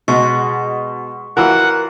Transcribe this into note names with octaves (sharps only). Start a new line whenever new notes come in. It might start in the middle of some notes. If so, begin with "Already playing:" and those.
B2 G#3 F#4 C#6
E3 F4 F#4 A#4 F#5